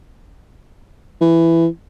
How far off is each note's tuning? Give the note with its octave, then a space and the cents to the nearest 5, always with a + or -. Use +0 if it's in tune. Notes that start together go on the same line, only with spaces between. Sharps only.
E3 +10